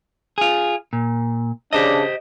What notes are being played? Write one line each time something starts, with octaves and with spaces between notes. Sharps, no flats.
F4 G#4
A#2
C#3 D4 G4 C5 D#5